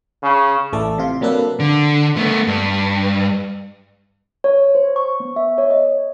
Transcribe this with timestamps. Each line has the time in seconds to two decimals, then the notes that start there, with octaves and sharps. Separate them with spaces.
0.23 C#3
0.73 A1 E3 A3 A4 D5
0.98 C3 F4 C6
1.21 C3 F#3 A#3 D4 A4 B4
1.60 D3
2.17 A3 B3
2.47 G2
4.44 C#5
4.75 C5
4.96 C#6
5.20 B3
5.36 E5
5.58 C#5
5.70 D#5